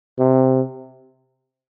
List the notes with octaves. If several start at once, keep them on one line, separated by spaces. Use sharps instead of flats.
C3